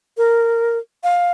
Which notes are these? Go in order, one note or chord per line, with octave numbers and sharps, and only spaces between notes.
A#4
F5